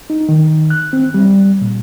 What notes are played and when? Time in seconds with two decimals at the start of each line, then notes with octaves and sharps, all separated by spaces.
0.10 D#4
0.29 D#3
0.70 F#6
0.93 C4
1.14 G3
1.61 A#2